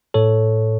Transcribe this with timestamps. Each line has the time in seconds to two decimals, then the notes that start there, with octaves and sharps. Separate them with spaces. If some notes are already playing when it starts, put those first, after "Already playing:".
0.14 A2 A4 C#5